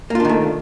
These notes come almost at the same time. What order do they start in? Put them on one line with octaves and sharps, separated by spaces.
A#3 F4 D4 D#3 A3